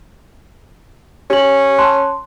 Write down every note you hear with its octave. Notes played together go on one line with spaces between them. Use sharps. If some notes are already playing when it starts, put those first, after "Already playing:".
C#4 G4 F#7
A5 C6 F#6